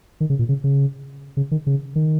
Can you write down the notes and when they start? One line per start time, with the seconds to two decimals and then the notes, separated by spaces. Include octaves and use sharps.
0.20 D#3
0.30 C#3
0.39 A#2
0.49 C#3
0.64 C#3
1.37 C#3
1.51 D#3
1.67 C#3
1.96 D#3